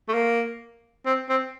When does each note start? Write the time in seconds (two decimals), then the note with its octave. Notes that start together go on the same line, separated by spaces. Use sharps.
0.09 A3
0.14 A#3
1.06 C4
1.29 C4